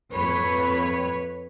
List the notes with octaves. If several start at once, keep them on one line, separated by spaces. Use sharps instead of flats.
F2 B4 C#5